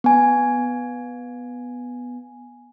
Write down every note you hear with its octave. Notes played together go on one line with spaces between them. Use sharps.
B3 G#5